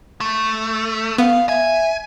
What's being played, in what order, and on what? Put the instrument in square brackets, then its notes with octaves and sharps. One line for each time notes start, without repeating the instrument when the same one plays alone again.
[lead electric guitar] A3
[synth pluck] B3 [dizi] F5
[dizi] E5 [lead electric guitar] G#5